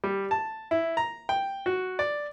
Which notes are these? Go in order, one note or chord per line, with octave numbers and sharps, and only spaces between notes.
G3
A5
E4
A#5
G5
F#4
D5